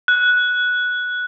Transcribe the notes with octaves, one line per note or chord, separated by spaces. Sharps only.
F#6